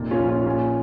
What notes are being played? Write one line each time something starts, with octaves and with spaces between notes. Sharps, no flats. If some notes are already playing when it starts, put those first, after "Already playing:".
Already playing: F1 A#2
C#4 F4
A#1
C#4 F4
A#2 C#4 F4